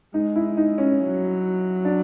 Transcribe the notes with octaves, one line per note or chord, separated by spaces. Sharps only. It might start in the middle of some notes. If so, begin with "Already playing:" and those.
G#3 D#4
E4
D#4
C#4
F#3
D4